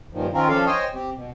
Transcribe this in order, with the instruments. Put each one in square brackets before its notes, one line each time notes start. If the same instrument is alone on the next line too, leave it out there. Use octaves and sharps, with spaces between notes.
[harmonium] G2 A#2 D#3 F3
D#3 C4 C#4 F4 A#4
F3 C#4 D4 A4 F5
C5 C#5 D#5 G5 G#5
C4 G4
B2